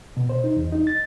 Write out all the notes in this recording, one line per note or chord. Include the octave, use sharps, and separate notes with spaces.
B2
C5
D#4
E2
D#4
A6